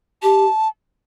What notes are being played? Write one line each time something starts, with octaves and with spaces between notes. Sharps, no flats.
G4 A5